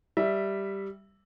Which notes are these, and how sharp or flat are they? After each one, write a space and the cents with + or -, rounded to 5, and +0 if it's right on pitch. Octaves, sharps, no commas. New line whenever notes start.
G3 +0 E5 +0